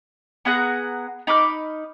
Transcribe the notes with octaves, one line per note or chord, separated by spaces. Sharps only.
B3 G#4 F#5 A#5
D#4 B5 D6 F6